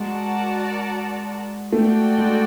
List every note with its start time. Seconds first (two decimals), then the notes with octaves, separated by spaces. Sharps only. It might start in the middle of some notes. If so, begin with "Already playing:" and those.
Already playing: G#3 F#4 A#4 D5 F#5 A5
1.72 A3 F#4 A4 D5 G5
2.18 G#3